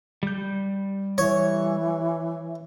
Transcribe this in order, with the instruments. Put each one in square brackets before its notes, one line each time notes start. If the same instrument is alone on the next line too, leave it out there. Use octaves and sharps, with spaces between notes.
[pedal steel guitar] G3 G6
[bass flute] E3 [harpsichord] C#5